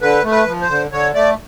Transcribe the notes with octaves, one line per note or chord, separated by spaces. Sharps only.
D3 B4
A3
B4
F3
C5
D3
D3 C#5
A3 D5